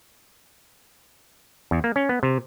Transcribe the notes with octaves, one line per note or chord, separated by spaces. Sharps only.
E2
A#3
C#4
B3
C3